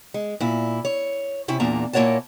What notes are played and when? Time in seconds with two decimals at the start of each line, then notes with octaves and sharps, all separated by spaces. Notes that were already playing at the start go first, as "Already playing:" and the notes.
0.14 G#3
0.40 A#2 E4
0.85 C#5
1.48 C3 C#4 E4 E5
1.60 E2 A#2 A#3 D4 A5 A#5
1.93 A#2 A#3 E4 C#5 F#5 A5